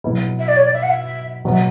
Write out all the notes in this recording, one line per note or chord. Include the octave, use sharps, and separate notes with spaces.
B2 F#3 B3 E4
E5
D5
C#5
D5
E5
F#5
E5
B2 F#3 B3
E5